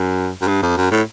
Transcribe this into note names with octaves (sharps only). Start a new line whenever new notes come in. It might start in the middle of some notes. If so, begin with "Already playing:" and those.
Already playing: F#2
F#2
G2
F2
F#2
A2